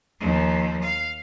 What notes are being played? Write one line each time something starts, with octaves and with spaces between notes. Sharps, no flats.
D#2 F3
F5